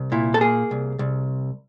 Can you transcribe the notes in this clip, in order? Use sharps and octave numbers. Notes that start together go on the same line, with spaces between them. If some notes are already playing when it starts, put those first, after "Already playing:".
Already playing: C2
A#2 E4
A4
A#3 G#4
C2
C2